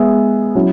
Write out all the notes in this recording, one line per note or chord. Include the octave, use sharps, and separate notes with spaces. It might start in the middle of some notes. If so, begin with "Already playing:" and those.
Already playing: G#3 B3 G#4 E5
F#3 C#4 E4